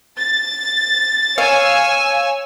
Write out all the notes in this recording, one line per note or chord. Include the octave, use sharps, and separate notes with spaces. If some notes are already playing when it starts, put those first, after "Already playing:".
A6
C#5 F5 G#5 E6